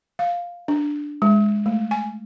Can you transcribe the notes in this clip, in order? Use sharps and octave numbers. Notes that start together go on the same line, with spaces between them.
F5
D4
G#3
A3
G#5